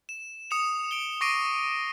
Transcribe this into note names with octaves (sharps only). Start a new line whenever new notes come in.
E7
D#6 C#7 E7 F7
D7 G7
C#6 D6 A#6 C7 D7 D#7